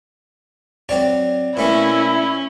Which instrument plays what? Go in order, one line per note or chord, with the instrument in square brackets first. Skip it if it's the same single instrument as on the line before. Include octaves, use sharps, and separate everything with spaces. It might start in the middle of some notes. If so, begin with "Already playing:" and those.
[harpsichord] F#3 C4 C#5 [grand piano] D5
[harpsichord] B2 A3 A#3 [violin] C#4 [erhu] E4